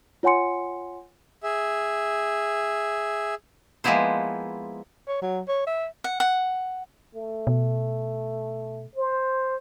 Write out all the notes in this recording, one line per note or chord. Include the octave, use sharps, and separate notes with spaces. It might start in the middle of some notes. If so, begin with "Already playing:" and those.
F4 C#5 F#5 G#5 C6 C#7
G#4 E5
F3 G#3 A#3 B3 E4 C5
C#5
F#3
C#5
E5
F#5
F#5
A3
B2
C5